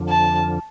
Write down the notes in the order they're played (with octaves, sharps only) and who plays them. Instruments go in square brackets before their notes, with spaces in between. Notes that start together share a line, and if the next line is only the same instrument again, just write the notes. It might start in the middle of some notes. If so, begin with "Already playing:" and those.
Already playing: [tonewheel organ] F2 D3 F3
[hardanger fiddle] A5